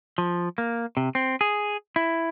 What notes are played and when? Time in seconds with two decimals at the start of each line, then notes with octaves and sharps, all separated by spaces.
0.18 F3
0.58 A#3
0.97 C3
1.15 C4
1.41 G#4
1.96 E4